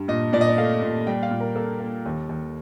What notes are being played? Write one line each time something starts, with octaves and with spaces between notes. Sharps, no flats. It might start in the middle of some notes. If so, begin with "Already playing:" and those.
Already playing: G2
A#2 D#5
A#2 D5
D#5
D5
A3 F5
A#2
G3 G5
F5
A#2
A#4
A#3 A4
A#3
D#2
D#2